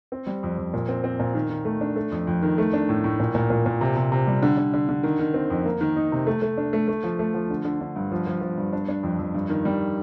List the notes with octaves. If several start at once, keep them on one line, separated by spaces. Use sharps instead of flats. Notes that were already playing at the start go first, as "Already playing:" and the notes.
C4
G3
F2
F2
A#2
C4
C4
A#2
D#3
D#3
A3
D4
A3
F2
F2
D#3
A3
D4
A2
A2
A#2
A#2
A#2
A#2
C3
C3
C3
G3
D3
D3
D3
D3
D#3
D#3
C4
F2
A#3
D#3
D#4
C3
A3
A3
D4
A3
A3
F3
A3
F3
D3
D3
D3
G2
F3
F3
F3
G2
D4
D4
F2
F2
G2
D#3
G3